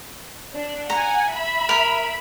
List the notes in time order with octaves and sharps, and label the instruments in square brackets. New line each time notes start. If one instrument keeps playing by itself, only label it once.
[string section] D4
[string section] F#5 G#5 [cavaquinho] A#5
[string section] E5 B5
[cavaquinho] A#4